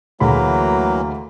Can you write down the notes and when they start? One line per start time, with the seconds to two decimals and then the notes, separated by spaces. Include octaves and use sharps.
0.20 D2 E3 F#3 A#3 G#4 B5